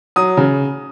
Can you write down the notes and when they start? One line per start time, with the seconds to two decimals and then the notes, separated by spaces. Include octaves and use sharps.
0.16 F#3 D#6
0.37 C#3